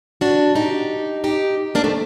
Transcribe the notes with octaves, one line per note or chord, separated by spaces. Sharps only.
D4 F#4
D#4 G4
D#4 G4
A#3 D4
A3 C4